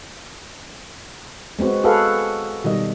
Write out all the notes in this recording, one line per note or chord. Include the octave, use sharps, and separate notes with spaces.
G#3 B3 C4 F#4
F#4 G#4 A4 B4 F5 F#5
B2 D#3 G3 D#5